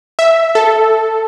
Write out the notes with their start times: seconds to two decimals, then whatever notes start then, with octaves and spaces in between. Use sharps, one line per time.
0.19 E5
0.55 A4